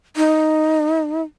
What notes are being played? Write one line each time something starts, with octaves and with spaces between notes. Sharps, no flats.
D#4